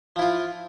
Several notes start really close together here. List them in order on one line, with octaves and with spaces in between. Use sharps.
F3 E4 F4